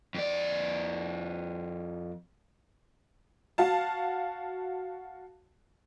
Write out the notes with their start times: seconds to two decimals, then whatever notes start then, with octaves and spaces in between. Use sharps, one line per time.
0.15 F2 D5
3.58 F#4 F5 A5